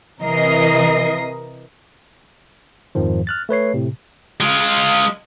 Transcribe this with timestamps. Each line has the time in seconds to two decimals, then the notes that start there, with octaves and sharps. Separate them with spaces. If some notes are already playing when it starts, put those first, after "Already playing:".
0.23 C3 E3 A#4 D#5 C7
2.95 F2 G#2 D#3 F3
3.27 F6 F#6 A6
3.49 A3 B4 C#5 C7
3.74 A2 C3
4.41 G#3 F4